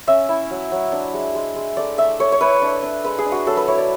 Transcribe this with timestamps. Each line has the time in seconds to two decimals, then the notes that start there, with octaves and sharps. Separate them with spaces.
0.08 C#4 E5
0.29 E4
0.50 F#3
0.71 F#3
0.92 D4
1.14 G#3
1.35 G#3
1.56 G#3
1.77 A3 D5
1.98 A3 E5
2.19 A3 C#5
2.32 C#5
2.41 E4 B4
2.62 D4
2.83 D4
3.04 G#3 B4
3.18 G#4
3.25 D4
3.32 F#4
3.47 F#3 A4
3.57 B4
3.68 E4 C#5
3.78 D5